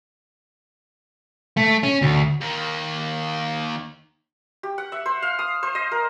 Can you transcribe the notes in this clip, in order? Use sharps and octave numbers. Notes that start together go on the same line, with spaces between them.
A3
C#4
D2
D#2 D#3
G4
F#5
E5
C5
F5
D#6
C5
D#5
A#4